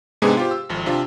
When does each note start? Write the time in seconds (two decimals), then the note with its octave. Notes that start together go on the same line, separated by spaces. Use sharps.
0.22 G#2 C3 G#3 B3 D4 G#4
0.37 F4 G4 C5
0.51 E6
0.69 G#1 F2
0.86 C3 D4 F4